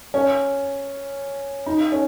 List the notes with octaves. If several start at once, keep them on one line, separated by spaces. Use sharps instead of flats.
C#4
D#4
C#4